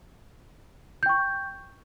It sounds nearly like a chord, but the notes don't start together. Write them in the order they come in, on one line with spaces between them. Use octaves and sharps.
G6 G5 C#6